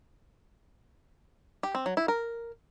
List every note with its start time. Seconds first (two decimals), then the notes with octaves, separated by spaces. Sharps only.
1.63 G4
1.75 C4
1.86 F#3
1.97 E4
2.08 A#4